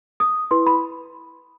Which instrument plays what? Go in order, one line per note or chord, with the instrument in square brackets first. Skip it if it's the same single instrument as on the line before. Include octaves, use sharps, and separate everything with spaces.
[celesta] D#6
E4 B4 C6
B5